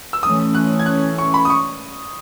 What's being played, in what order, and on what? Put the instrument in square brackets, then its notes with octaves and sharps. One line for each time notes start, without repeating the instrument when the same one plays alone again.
[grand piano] E6
[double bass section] E3 A3 C#4 [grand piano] D#6
[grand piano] F#6
G#6
F#6
C#6
B5
D#6
C#6